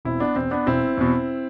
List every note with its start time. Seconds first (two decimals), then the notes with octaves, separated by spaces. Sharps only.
0.05 E1 C4 E4
0.20 B3 D4
0.36 E2 B2 C4
0.51 B3 D4
0.66 E1 C4 E4
0.97 E2 B2